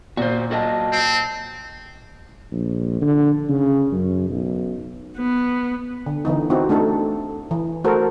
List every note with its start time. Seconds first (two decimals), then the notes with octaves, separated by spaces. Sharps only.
0.17 A#2 F#4 C5
0.51 F#4 A4 D#5 G5 A5
0.93 C4
2.52 A#1
3.01 D3
3.49 C#3
3.92 F#2
4.29 B1
5.17 B3
6.06 D3
6.25 D3 E3 B3 D#4
6.50 C4 D#4 E4 F#4 G4
6.69 A3 D4 D#4 A4
7.51 E3
7.84 A3 F#4 A4 A#4 C5